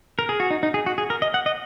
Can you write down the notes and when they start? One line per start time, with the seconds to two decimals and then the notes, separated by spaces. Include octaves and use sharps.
0.19 A#4
0.29 G#4
0.40 F#4
0.51 D#4
0.63 D#4
0.74 G#4
0.86 F#4
0.98 G#4
1.10 A#4
1.22 D#5
1.34 F#5
1.46 D#5